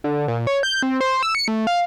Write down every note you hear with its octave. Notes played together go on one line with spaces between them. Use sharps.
D3
A#2
C#5
G6
C4
C5
E6
C#7
A3
F5